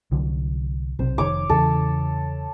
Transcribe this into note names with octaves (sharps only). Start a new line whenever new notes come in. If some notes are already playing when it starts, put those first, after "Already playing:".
C2 D3 F#3
B1 C3 C5
F1 D#3 C#5 D6
E2 C#3 E3 A4